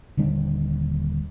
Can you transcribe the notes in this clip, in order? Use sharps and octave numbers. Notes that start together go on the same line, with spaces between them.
D#1 D3 G3 D4